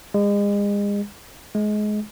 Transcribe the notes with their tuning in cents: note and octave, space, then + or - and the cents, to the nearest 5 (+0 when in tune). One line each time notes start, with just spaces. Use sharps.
G#3 -35
G#3 +25